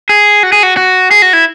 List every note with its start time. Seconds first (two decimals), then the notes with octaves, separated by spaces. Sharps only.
0.09 G#4
0.43 F#4
0.53 G#4
0.63 F#4
0.77 F#4
1.11 G#4
1.22 F#4
1.33 E4